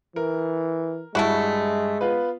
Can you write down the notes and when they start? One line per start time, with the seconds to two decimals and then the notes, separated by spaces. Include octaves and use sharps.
0.16 E3 A#4
1.15 G2 G#3 A3 E4 F#4
2.01 B3 F4 B4